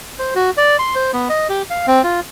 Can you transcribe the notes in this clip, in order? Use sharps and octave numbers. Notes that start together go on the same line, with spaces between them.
C5
F#4
D5
C6
C5
B3
D#5
G4
F5
C4
F4